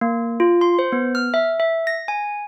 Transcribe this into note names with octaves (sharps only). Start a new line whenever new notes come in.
A#3
F4
C6
C5
B3
F6
E5
E5
A#6
G#5